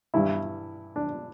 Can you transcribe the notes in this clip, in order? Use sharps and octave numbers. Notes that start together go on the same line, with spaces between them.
G2 E3 G3 E4
D4